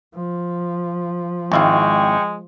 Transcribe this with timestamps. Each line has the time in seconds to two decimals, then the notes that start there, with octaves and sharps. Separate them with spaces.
0.15 F3
1.52 G#1 G#3 E4 F5 G5 C#6